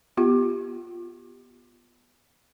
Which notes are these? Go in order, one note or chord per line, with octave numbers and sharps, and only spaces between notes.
B3 F4 G4